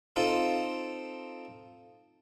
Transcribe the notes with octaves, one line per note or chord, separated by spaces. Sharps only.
C4 D#4 F4 A4